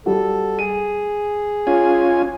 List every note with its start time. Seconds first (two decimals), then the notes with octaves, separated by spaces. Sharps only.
0.06 G3 F#4 A4
0.59 G#4 D#7
1.67 C#4 F4 G#5